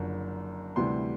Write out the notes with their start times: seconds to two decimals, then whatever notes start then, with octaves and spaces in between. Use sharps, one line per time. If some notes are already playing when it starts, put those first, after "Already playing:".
Already playing: F#1 F#2 D3 F3
0.76 D2 C3 E3 G3 C6